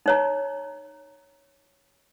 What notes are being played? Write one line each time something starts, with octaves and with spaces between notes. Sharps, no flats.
D#4 C#5 A#5